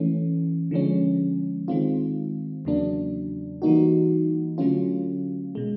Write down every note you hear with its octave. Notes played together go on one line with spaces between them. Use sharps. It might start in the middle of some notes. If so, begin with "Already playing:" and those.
Already playing: E3 A3 C#4
D3 F3 G#3 C#4
D#3 G#3 C4 F4
E2 C#3 F#3 A#3 D4
E3 G3 A#3 D#4 F#4
D3 F#3 A3 C#4 F4
B2 G#3